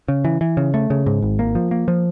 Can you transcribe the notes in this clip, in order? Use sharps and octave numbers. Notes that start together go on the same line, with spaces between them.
C#3
E3
E3
C#3
A3
C#3
G#2
G#1
A#3
F3
A#3
F3